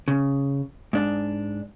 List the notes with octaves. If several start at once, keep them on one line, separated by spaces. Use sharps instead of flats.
C#3
G#2 D4